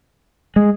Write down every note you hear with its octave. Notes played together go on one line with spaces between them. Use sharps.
G#3